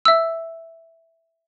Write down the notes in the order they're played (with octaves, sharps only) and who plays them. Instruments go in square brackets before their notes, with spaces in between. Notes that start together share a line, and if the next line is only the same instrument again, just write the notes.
[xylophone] E5 E6